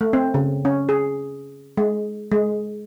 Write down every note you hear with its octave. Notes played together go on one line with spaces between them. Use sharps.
A3
C4
C#3
C#4
G#4
G#3
G#3